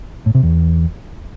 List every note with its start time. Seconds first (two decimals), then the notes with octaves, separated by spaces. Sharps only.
0.26 A2
0.35 C3
0.43 E2